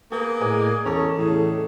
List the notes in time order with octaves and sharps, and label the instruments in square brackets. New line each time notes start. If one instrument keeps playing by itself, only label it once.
[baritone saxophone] A#3 [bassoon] B3 [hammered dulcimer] G#4
[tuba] A2 [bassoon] G#3 [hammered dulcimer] D5 D#5 G#5
[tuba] E2 [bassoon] C#4 [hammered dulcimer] A4 C#5 A#5
[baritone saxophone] A2 [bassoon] C#3 [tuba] E3